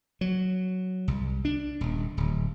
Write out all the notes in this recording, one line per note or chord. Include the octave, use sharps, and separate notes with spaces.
F#3
C2
D4
D#1
D1